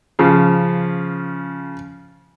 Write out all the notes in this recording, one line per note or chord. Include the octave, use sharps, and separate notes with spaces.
C#3 F3